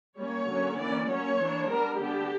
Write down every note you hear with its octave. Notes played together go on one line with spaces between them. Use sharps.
G3 A#3 C#4 C#5
D3 F#3 A#3 C#4
E3 A#3 C#4 D5
F#3 A#3 C#4 C#5
E3 A#3 D4
G3 B3 D4 A#4
D3 G3 B3 D4 G4